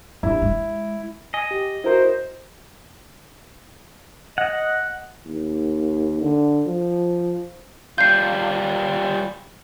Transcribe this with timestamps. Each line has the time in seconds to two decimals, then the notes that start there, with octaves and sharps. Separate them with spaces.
0.23 G2 E4
0.42 G#3
1.34 D#5 G#5
1.51 G4
1.84 E4 F#4 A#4 C5
4.38 D#5 F#5
5.26 D#2
6.21 D3
6.66 F3
7.98 G3 F4 G6 C7